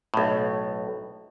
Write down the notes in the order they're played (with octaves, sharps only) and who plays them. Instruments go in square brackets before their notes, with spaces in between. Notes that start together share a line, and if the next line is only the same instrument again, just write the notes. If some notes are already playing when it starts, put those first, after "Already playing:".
[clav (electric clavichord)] B1 A2